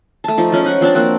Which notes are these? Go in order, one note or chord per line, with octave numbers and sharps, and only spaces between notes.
A3 A5
F3 D#4
F3 G#3 C#4
D#4 F#5 C#6
F3 C4 D4 A5
F3 A#3 C4 F#4